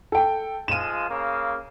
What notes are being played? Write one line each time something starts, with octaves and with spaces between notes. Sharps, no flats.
A4 G5
F3 G#3 F4 D#7 E7
C#3 A#3